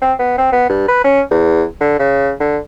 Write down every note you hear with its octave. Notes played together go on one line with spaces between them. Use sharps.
C4
B3
C4
B3
G2
B4
C#4
E2
D3
C#3
D3